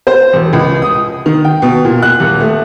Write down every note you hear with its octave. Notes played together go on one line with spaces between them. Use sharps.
C5
E1
C#2
D#6
D#3
G5
B2
A#2
F#6
D#1
A3